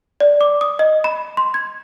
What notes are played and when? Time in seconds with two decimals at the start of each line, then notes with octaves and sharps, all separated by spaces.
0.20 D5
0.41 D6
0.61 D#6
0.79 D#5
1.04 B5
1.37 C6
1.54 G#6